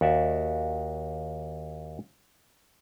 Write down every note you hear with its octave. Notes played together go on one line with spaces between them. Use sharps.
D#2 F#4 D5 E5